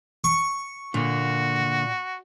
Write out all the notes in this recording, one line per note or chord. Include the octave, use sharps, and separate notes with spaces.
C#6
A#2 D3 A#3 F#4